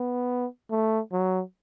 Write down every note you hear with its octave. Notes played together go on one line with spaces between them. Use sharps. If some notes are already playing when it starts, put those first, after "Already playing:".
Already playing: B3
A3
F#3